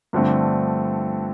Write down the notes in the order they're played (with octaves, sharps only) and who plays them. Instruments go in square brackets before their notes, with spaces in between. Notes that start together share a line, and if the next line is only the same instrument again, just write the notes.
[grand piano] G2 D3 F3 A3 C4